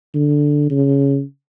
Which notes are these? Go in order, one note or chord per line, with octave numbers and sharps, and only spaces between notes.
D3
C#3